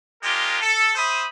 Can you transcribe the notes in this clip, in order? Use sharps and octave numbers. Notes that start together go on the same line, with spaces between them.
G#3 D4 F4 G4 A#4
A4
C5 E5 B5 D#6